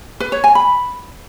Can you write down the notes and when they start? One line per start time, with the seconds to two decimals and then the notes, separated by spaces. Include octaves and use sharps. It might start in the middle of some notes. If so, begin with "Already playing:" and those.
0.20 B4
0.32 C#5
0.44 G#5
0.55 B5